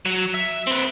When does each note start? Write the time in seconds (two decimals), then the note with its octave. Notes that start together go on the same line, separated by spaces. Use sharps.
0.06 F#3
0.34 E5
0.67 C4 B4